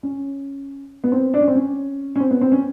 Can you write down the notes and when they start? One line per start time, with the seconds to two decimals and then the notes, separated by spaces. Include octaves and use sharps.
0.03 C#4
1.04 B3
1.12 C4
1.34 D4
1.41 C#4
1.48 C4
1.55 C#4
2.16 C#4
2.20 C4
2.31 B3
2.41 C4
2.52 C#4